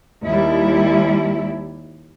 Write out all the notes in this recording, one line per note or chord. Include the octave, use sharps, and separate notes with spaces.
D#2 G3 E4